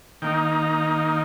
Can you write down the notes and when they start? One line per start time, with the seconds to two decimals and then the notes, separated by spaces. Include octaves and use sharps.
0.22 D#3 A#3 D#4 G5